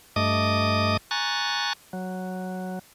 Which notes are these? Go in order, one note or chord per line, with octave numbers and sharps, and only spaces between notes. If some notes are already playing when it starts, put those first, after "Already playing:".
G2 A3 D#5 D6 D#6
G#5 A#5 C#6 F#6 A6
F#3